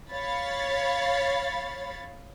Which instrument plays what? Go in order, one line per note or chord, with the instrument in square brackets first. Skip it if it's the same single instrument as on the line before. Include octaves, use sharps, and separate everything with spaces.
[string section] C#5 F5 B5 A6